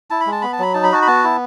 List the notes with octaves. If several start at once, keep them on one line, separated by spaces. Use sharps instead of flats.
E4 A5
B5
G#3
A5
B3 B5
A5
F#3 B5
D#4 A5
B5
F#4 A5
B5
B3 A5
E4